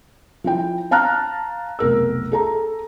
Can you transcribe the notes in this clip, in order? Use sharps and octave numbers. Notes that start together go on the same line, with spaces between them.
F3 E4 G5
F5 A5 A#5 F6 F#6
F1 B1 A#4 E6
G#4 A4 A#5